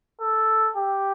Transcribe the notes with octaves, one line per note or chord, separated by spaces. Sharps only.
A4
G4